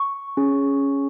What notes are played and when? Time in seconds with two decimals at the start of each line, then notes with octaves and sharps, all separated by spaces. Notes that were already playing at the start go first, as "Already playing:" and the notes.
Already playing: C#6
0.37 C#4 G#4